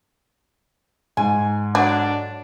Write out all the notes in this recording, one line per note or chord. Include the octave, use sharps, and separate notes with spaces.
G#2 G#5
D3 F#3 D4